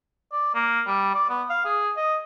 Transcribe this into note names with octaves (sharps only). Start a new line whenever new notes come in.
D5
A#3
G3
D5
B3
F5
G#4
D#5